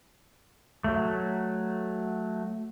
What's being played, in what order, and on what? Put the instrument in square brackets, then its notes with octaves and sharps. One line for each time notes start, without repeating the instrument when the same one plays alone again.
[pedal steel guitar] F#3 A3